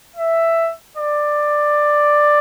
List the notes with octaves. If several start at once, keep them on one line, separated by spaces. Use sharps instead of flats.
E5
D5